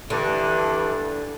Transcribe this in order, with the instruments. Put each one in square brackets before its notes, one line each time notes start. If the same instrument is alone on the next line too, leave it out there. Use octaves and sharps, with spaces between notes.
[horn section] G2 E3 D4 [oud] D3